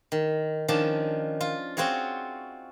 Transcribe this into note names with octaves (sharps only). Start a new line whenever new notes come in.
D#3
D#3 F3 C#4 D4 A5
F4
C4 F4 F#4 G#4 C#5